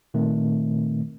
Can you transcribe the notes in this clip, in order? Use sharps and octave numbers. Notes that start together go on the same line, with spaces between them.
A#2 D#3 A3 C4